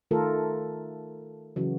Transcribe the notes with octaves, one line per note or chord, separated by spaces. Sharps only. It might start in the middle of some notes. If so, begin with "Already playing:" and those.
D#3 A3 F4 A4 A#4
C#3 E3 F#3